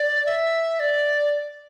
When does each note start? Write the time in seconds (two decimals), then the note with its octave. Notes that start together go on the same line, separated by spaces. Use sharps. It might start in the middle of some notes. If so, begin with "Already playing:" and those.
Already playing: D5
0.26 E5
0.80 D5